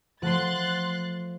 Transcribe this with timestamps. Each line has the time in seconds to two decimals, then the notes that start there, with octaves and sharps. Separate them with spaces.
0.22 F3 A3 F#4 C6 F#6 A6